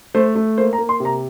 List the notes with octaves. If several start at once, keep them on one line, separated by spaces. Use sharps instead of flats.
A3 C5
A3
A#3 C5
A#5
A#3
C6
C3
A#5